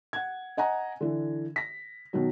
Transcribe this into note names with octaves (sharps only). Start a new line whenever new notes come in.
F#5 G#6
D#5 F#5 G#5 A#5
D3 E3
A#6 B6
B2 D#3 F#3